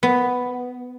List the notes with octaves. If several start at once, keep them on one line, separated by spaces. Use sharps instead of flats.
B3